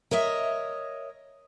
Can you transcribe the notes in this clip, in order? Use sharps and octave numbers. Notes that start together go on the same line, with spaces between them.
A#4 C#5 D#5 E5